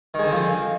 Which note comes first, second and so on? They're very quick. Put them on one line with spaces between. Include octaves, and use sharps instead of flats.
D#3 G#3 D3 C4 F3